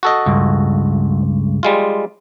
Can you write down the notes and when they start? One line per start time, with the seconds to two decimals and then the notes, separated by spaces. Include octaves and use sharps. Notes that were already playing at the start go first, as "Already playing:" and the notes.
0.03 F#4 A4 D#5
0.26 C#2 G2
1.63 G3 G#3 F4